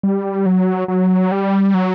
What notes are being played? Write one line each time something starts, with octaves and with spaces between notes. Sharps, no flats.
G3
F#3
F#3
G3
F#3